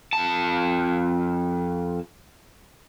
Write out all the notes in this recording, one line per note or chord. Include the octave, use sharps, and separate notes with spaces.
F2 A5